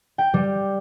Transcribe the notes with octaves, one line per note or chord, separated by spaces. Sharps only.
G5
G3